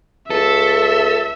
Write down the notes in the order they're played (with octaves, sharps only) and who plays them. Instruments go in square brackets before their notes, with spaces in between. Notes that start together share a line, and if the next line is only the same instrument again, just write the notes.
[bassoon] C#2 [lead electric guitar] A4 [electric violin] E5